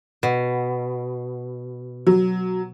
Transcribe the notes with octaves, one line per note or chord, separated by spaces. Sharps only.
B2
F#3